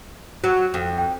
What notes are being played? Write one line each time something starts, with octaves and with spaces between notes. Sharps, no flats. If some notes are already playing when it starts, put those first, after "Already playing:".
F#3
F2
G5